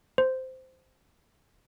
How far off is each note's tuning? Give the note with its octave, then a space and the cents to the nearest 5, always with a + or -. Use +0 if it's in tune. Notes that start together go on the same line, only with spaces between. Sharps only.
C5 -10